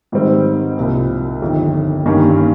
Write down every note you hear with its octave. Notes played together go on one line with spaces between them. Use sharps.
G#2 D#3 G3 C4
C2 A#2 F3 A#3
G1 F2 D#3
G2 D#3 A#3 C#4 G4